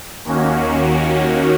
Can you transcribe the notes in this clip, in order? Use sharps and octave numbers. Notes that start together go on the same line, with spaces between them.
D#2 D#3 A#3 C#4 F#4